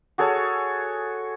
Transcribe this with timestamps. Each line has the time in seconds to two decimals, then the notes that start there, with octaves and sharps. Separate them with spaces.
0.18 F#4 G#4 A4 C#5